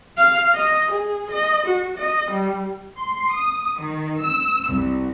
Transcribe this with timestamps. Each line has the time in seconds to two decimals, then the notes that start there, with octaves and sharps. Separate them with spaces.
0.17 F5
0.55 D#5
0.92 G#4
1.31 D#5
1.66 F#4
1.98 D#5
2.31 G3
2.98 C6
3.31 D#6
3.80 D#3
4.22 E6
4.70 C2